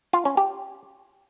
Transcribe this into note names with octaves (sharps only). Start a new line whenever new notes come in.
F4
C#4
G4